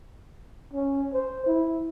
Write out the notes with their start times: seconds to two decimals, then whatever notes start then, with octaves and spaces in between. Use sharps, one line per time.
0.74 C#4
1.13 C5
1.46 E4